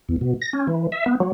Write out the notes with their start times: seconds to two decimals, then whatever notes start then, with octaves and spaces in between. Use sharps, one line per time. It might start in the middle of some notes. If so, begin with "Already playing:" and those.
0.09 E2
0.21 B2
0.42 A#6
0.53 C#4
0.67 E3
0.92 E5
1.06 B3
1.20 F#3